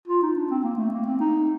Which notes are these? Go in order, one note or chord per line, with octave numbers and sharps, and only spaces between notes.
F4
D#4
D4
C4
A#3
A3
A#3
C4
D#4